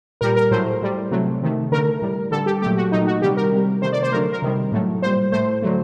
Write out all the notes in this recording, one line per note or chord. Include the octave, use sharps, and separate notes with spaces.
A#2 G3 A#4
A#4
A2 F#3 A3 C5
A2 G3
C3 F#3 A3
C3 D#3 A3
D3 A3 A#4
A2 G3
D3 G3 A4
G4
A#2 F#3 A3 G4
F#4
A#2 F#3 A3 D#4
F#4
C3 D#3 G3 G4
A#4
C3 G3
C3 D#3 A3 C5
D5
C5
D3 F#3 A3 A#4
A#4
C3 D#3 G3
A2 F#3 A3
A#2 G3 C5
A2 A3 C5
D3 F#3 A3